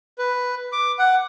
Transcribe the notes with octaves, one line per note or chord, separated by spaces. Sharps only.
B4
D6
F#5